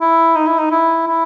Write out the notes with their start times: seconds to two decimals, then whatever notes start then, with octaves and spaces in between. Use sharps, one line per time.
0.01 E4
0.36 D#4
0.47 E4
0.58 D#4
0.71 E4
1.07 E4